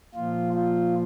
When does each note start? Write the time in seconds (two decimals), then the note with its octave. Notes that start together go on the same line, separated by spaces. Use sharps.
0.15 A#2 F3 F4
0.53 F4